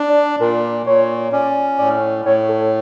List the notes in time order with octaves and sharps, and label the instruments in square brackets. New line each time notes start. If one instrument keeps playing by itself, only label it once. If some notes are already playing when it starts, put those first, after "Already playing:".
Already playing: [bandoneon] D4
[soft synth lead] D5
[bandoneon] A#2 [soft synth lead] A#4
[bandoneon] A#2 [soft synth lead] C#5
[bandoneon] C#4 [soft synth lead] D5
[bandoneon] A2 [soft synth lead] D5
[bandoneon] A2 [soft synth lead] C#5
[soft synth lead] A4